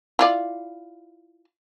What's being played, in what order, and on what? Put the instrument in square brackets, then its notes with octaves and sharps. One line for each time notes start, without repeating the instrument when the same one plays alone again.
[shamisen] E4 F4 D5